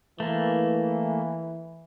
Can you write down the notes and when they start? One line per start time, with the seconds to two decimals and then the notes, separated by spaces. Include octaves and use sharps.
0.20 E3 A3 A#3